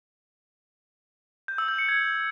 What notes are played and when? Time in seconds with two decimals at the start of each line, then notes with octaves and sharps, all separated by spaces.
1.48 G6
1.58 E6
1.68 G6
1.78 C#7
1.89 G#6